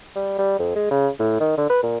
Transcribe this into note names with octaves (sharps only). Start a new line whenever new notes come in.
G3
G3
F2
G#3
C#3
A2
D#3
D3
B4
A#2